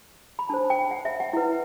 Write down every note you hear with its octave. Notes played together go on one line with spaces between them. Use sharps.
B5
D4 A4 C5 A5
G5
F#5
E5
F#5
E4 B4